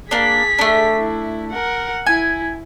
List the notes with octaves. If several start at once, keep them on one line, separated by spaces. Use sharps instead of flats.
A#3 D4 G#4 B6
A3 D4
E4
A#4 F#5
E4 G#5